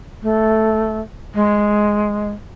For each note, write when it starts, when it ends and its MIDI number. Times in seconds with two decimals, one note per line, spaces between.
0.23 1.00 57
1.34 2.30 56